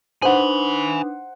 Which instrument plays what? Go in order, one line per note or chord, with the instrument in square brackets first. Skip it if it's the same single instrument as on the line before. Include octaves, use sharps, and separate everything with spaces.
[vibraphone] D4 D#4 B4 [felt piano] C5 F#5 [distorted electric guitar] G#5 B5